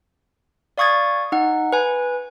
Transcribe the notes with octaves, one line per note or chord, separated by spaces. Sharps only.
D5 F5 C#6 D#6 G#6 A6
D#4 F#5
B4 G#5